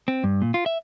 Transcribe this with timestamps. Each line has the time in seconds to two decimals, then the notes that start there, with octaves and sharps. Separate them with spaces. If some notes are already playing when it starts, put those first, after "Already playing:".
0.08 C4
0.24 G2
0.42 A#2
0.54 F4
0.66 E5